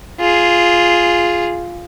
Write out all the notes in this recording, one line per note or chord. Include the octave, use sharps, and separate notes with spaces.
F4 G#4